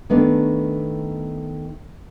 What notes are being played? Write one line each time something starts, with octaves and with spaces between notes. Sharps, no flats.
D#3 A3 B3 D4